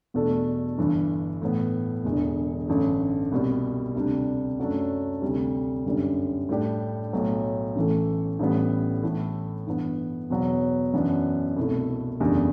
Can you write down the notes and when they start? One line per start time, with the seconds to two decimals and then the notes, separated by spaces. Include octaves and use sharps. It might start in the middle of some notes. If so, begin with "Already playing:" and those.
0.14 E2 B2 A3 D4 A4
0.78 G1 G2 E3
1.42 A2 E3 B3
2.04 E1 E2 D3
2.68 A1 G2 D3 A3
3.32 C2 B2 G3
3.95 D2 C3 G3 D4
4.59 F#2 F#3 A3 D4 A4
5.22 D2 C3 G3
5.85 G1 F#2 D3 G3
6.49 A2 G3 D4 G4
7.13 B1 A2 F#3
7.76 A1 A2 E3 A3
8.39 A1 A2 E3 G3 B3
9.03 A2 E3 A3 E4
9.67 G2 E3 B3
10.30 E2 B2 F#3 B3
10.93 F#2 E3 B3 D4 F#4
11.57 C2 B2 A3 E4
12.20 F#1 E2 D3 G3